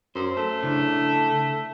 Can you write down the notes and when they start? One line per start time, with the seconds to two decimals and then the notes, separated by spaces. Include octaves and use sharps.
0.15 F#2 C5
0.37 A3
0.63 C#3 D4 E4